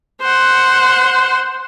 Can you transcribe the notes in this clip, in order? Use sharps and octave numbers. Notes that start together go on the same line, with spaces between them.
C5 F#5